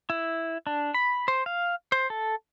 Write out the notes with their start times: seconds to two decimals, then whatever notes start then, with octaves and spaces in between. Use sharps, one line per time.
0.10 E4
0.67 D4
0.94 B5
1.28 C5
1.46 F5
1.92 C5
2.10 A4